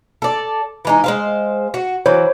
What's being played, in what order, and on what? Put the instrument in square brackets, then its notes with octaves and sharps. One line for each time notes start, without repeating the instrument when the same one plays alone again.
[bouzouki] A4 D5
E3 G#3 D#4
G#3 C5 F5
F#4
[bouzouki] E3 F#3 [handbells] C5 C#5